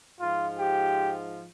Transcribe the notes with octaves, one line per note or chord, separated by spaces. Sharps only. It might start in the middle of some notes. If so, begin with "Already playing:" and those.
G#2 F3 F4
G4